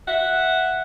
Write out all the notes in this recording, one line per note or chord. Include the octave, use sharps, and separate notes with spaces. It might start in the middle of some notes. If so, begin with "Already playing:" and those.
E5 F#5